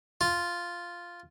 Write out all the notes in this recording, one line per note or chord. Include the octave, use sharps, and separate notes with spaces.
F4